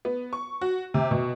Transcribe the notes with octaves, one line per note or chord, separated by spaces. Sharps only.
B3
C#6
F#4
C3
B2